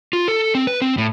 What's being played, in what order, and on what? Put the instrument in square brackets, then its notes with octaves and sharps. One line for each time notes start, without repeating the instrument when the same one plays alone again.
[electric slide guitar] F4
A4
C4
B4
C4
A2